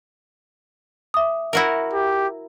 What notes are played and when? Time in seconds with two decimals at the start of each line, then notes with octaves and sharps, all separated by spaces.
1.14 E5 D6 D#6
1.53 E4 F#4 A#4
1.93 G4